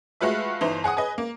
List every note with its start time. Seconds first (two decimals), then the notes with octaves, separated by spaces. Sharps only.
0.21 G#3 A3 F4 F#4 B4 E5
0.61 G1 E3 D#4 C5
0.84 G#4 F#5 G#5 D#6
0.97 G#4 B4 D#5
1.18 A#3